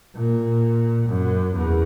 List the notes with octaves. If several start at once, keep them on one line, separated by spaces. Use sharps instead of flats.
A#2
F#2
E2